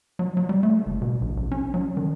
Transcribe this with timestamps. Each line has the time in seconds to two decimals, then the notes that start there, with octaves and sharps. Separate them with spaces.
0.19 F#3
0.37 F#3
0.49 G3
0.63 A3
0.86 F#1
1.02 B2
1.21 A#1
1.37 A#1
1.52 C#4
1.74 F#3
1.97 D#3